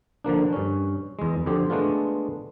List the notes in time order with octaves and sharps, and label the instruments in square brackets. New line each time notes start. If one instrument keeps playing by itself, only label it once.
[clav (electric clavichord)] D3 F3 A#3 D4
G2 C#4
E2 G#3
F2 D3 G4 C5
G#3 A3 B3 D4 F4